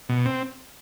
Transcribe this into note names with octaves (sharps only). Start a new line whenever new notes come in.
B2
C4